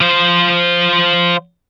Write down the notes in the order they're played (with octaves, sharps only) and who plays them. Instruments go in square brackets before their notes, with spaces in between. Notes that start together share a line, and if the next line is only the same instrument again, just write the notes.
[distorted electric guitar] F3 C5